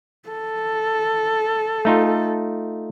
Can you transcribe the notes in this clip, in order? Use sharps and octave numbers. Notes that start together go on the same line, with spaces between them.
A4
A3 D#4 F4